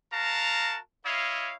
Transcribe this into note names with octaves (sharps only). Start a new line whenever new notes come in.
F#4 A#4 F5 A5 A#5
E4 C#5 D#5 F5